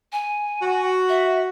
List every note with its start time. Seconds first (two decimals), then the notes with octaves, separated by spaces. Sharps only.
0.13 G#5
0.62 F#4
1.09 E5